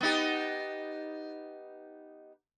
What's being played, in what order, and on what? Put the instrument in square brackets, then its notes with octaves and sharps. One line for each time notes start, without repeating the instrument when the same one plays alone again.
[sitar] B3 D#4 G4